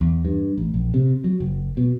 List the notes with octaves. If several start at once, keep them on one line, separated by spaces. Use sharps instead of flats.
E2
G2
A1
A#1
C3
F#3
F#1
B2